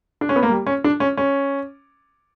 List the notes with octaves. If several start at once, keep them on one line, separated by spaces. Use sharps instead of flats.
D4
C#4
B3
A#3
G3
C#4
D4
C#4
C#4